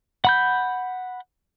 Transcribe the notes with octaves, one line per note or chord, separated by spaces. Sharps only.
F#5 B5 G6